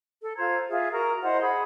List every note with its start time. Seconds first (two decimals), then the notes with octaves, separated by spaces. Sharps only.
0.22 A4
0.36 F4 C5 A#5 G#6
0.70 F4 G#4 E5
0.92 F#4 A#4 A#5
1.22 E4 C5 D#5 F#5
1.42 G#4 F#5 B5